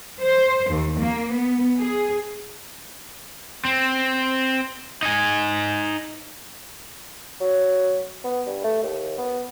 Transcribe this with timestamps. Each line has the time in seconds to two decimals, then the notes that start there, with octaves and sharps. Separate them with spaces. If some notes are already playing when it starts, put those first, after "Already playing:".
0.21 C5
0.70 D#2
0.99 A#3
1.32 B3
1.77 G#4
3.65 C4
5.03 D#4 G#5
7.41 F#3
8.24 B3
8.47 G2
8.64 A3
8.83 D#2
9.18 B3